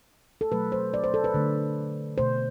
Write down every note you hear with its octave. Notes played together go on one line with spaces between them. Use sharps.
A4
B2 F#3 A3 B4
C5
D5
C5
A4
B4
D3 A3
B2 A3 C5